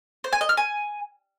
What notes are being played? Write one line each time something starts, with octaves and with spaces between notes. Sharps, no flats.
C5
G#5
D#5
F6
G#5